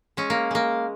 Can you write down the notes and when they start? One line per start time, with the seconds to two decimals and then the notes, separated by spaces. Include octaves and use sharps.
0.17 G#3 C#4
0.30 A#3
0.51 G#3 A#3